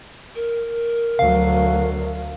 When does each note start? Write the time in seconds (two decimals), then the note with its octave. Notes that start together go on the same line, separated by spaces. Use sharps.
0.35 A#4
1.19 D2 F#3 F5